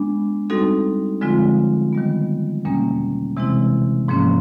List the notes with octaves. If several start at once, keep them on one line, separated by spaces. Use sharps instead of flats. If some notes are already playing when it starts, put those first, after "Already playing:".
Already playing: G#3 B3 D4
G3 C4 D#4 F#4 A4
D3 F3 G#3 C4 F4
D#3 G3 B3
E2 B2 G3 A#3 C#4
C3 E3 G#3 C4 E4
G#2 F3 A#3 C#4